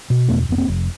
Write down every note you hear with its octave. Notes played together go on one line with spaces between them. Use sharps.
B2
E2 A3 B3
F1 B3
A#3 C4
F1